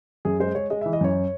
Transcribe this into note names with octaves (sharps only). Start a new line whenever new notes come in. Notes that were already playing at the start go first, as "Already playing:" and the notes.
F#2 G#4
G#3 C5
G#3 C#5
G#3 D#5
E5
E3
D#5
F#2 C#5